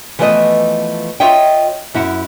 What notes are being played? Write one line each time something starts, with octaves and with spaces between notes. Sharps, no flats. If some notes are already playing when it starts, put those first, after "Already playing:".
E3 F3 A3 B3 D5 D#5
F4 C#5 D#5 E5 G5
F#2 E4 F#5